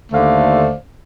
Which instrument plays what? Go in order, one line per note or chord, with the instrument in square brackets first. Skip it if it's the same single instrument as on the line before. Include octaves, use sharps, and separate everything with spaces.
[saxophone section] D#2 D3 A3 C5 D5 F5